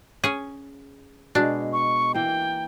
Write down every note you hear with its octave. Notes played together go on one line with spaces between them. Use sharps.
C#4 G#4
B2 G#3 D4
C#6
E3 A#3 G5